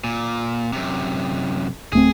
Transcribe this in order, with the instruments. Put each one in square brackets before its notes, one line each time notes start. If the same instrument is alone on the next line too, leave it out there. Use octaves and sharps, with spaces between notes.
[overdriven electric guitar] A#2
F#2 C3
[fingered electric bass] D1 A3 C4 [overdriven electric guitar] G#4